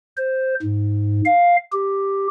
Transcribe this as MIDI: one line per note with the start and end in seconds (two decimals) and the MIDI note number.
0.17 0.54 72
0.63 1.22 44
1.25 1.56 77
1.73 2.28 67